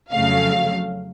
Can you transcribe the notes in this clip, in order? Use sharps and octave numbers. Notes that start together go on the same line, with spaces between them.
F2 C#3 F#3 A3 F5